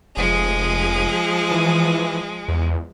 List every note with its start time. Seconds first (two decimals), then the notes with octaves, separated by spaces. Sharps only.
0.17 F1 F3 G#3 G#4
1.51 E3
2.48 E2